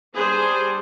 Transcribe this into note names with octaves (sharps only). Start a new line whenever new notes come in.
G3 D4 G#4 C5